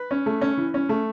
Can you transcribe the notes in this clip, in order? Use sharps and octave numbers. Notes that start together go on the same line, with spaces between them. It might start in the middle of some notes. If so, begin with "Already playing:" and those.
Already playing: B4
C#4
A3
C#4
E3
C#4
A3